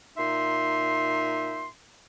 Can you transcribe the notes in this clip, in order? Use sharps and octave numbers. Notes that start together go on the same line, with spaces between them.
A#2 D#4 E5 C6